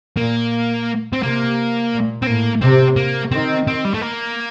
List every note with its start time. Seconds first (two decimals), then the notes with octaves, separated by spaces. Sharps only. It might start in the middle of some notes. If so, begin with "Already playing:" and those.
0.17 A#2 A#3
1.13 C4
1.22 C3 A#3
1.92 A#2
2.22 C4
2.26 A2 A#3
2.61 C3 C4
2.96 A#3
3.32 D#3 C4
3.67 C4
3.85 G3
3.94 A3
4.01 A#3